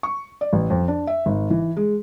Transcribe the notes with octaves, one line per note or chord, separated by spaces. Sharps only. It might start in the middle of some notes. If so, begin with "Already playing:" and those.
C#6
D5
A1
F2
D4
E5
G#1
E3
G#3